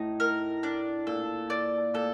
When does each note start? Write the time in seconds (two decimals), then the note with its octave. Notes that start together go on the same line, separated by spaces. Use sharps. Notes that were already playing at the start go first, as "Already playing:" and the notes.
Already playing: A2 D#4
0.20 A#4
0.63 D4
1.07 A#2 A4
1.50 D5
1.94 A#2 A4